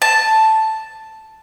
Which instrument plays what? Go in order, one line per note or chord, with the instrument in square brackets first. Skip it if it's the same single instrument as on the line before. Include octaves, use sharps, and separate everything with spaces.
[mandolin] A5